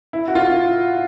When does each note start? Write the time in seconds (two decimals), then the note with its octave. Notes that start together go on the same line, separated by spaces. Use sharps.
0.13 E4
0.28 F#4
0.35 F4